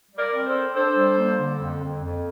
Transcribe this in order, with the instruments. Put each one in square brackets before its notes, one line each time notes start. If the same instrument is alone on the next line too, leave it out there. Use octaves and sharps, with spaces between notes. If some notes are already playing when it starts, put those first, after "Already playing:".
[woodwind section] G3
[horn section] A#4 D5
[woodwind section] C4
[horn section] A4 C5
[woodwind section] C4
[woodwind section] D4 [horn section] A4 C5
[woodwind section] G3
A#3
D3
F2
F2
F2